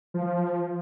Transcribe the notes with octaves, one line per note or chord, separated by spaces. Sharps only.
F3